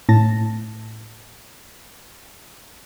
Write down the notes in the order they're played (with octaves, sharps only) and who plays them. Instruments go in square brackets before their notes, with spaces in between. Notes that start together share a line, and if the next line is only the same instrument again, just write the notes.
[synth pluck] A2 A5 A#6